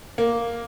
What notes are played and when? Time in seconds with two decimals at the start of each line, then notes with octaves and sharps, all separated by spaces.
0.18 A#3